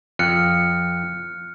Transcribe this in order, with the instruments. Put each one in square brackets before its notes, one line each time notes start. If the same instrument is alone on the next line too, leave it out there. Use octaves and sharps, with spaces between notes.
[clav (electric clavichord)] F2 [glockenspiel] F6 F#6 C#7